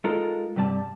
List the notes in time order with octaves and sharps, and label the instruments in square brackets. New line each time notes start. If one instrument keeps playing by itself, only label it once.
[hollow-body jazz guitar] G#3 D#4 F4 A4 A#4
G2 C3 G3 D5 A5